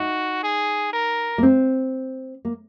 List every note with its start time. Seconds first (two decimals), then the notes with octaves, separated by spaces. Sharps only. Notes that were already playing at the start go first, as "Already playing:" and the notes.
Already playing: D#4 F#4
0.43 G#4
0.93 A#4
1.38 A#3
1.43 C4
2.45 A#3